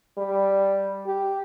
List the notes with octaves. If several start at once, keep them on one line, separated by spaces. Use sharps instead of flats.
G3
G4